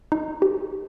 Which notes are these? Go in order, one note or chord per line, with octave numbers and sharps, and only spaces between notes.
D#4
G4